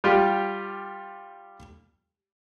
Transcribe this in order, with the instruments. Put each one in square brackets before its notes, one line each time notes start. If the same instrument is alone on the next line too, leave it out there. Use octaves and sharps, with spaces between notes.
[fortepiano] G3 F4 G4